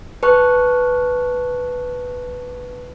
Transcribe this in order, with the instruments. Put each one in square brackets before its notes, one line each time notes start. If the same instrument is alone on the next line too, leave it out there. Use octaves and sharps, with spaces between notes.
[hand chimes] B4 A5 C#6 F#6